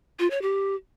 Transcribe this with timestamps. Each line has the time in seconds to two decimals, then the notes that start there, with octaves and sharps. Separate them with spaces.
0.19 F4
0.31 C#5
0.42 G4